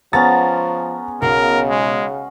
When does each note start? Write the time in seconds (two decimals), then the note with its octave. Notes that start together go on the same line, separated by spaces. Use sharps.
0.13 F3 G#3 B3 C#4 A5 A#5 A6
1.22 B1 C#3 A#4 D#5 F5 F#5
1.70 G#3